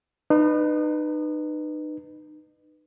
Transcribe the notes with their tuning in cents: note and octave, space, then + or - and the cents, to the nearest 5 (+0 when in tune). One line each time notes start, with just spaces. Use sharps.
D#4 -35 B4 +0